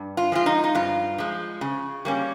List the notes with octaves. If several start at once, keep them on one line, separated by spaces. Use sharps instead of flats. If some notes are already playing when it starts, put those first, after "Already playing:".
Already playing: G2
F4
F3 G#3 F4
D#4
D#4
G2 F4
F3 G#3
C#3
G3 A#3 C#4